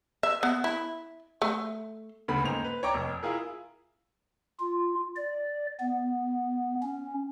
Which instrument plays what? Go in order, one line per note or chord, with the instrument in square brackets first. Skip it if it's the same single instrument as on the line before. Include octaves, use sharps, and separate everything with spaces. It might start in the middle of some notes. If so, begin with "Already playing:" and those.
[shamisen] E5
B3
E4
A3
[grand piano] D2 C#3 A3 B3 B5
D#2 G#2 C5 F7
B4
C#5 D5 G5 A#5 C#6 D6
F1
E4 F4 G#4 A#4
[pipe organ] F4
D5
B3
C#4